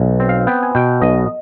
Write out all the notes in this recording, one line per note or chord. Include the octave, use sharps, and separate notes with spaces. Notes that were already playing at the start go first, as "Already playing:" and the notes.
Already playing: B1
C4
F5
B3 G5
G#5
B2 G5
B1 D#5